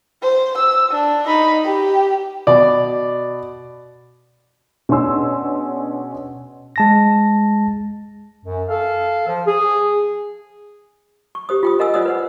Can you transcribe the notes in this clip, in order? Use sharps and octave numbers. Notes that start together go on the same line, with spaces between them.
C5
E6
D4
D#4 B5
G4
B2 D5
B2 C#4 D4 G#4 C6 E6
G#3 A5 A#6
F#2
A4 F5
F3
G#4
C#6
G4 C5 D#6
F4 G5 D#6
A#4 D#5 F#5 G#5 D#6 E6
F4 C5 D5 F#5 D#6 E6
B4 C5 F#5